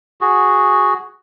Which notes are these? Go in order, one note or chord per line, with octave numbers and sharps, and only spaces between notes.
F#4 G#4